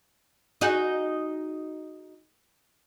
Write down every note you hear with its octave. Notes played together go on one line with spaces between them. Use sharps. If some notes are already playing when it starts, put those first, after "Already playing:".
D#4 F#4 G#4